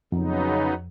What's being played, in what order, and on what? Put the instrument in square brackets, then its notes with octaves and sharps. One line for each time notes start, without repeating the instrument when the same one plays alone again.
[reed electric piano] F2 [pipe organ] C#3 F#3 B3 D#4